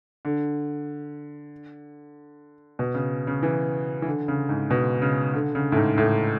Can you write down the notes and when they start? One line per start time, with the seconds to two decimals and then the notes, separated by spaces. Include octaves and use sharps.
0.25 D3
2.79 B2
2.94 C#3
3.27 C#3
3.43 E3
4.02 E3
4.07 D3
4.28 C#3
4.49 G#2
4.70 B2
5.02 C#3
5.33 D3
5.55 C#3
5.72 A2
5.77 G#2
5.98 A2